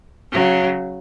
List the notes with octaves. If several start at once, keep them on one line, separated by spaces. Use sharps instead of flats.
C#3 F#3